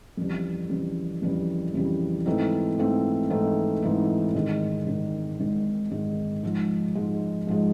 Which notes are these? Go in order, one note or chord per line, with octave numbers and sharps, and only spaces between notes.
F2 C#3 E3 G3
F2 C#3 E3 G3
F2 C#3 E3 G3
F2 C#3 E3 G3
G#2 E3 A3 C4 D#4
G#2 E3 A3 C4 D#4
G#2 E3 A3 C4 D#4
G#2 E3 A3 C4 D#4
G#1 G#2 D#3 G#3
G#1 G#2 D#3 G#3
G#1 G#2 D#3 G#3
G#1 G#2 D#3 G#3
G#2 F3 G#3
G#2 F3 G#3
G#2 F3 G#3